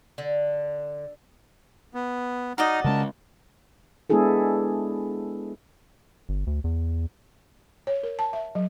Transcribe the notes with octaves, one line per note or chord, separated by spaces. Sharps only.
D3
B3
D#4 F#4 D5 D#5 A#5 F6
C#3 G#3 C#4 A#4 A5
G#3 B3 D4 E4 G#4 A4
G1
D2
E2
C#5
A#4
A5
E5
F#3